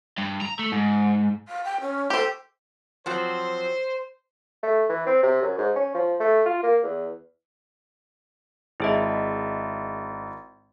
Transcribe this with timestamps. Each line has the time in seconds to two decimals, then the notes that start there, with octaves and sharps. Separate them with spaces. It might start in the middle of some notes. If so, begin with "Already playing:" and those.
0.18 G2
0.41 A#5
0.59 A3
0.72 G#2
1.48 F5
1.64 G5
1.80 C#4
2.10 G4 A4 C5
3.06 F3 F#3 C4 C5
4.63 A3
4.89 E3
5.07 C4
5.23 C3
5.42 F#2
5.58 G#2
5.76 C#4
5.94 F3
6.20 A3
6.46 F4
6.63 A#3
6.83 E2
8.80 G#1 E4 G#4 D#5 E5